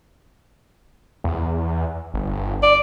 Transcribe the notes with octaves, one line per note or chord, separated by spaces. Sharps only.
E2
G1
D5